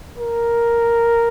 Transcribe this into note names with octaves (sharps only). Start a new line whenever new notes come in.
A#4